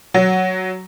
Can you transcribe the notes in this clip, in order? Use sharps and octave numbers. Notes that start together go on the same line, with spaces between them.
F#3